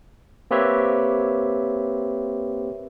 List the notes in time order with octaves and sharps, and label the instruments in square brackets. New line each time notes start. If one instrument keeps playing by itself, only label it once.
[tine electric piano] A#3 C4 G4 B4 C#5 E5